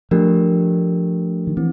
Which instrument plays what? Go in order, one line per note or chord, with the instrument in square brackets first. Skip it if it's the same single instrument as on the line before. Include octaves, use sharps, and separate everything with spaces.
[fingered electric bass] F3 [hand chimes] A3 D4 G4 A#4
[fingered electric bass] D#3
[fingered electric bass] E3 [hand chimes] C4